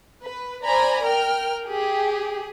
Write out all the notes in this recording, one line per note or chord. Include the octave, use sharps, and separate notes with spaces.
B4
C5 D5 G#5 A#5 B5
A#4 G5 F6
G4 G#4